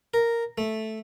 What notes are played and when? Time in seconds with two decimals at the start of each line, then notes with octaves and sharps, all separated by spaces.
0.14 A#4
0.58 A3